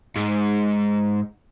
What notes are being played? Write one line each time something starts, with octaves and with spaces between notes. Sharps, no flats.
G#2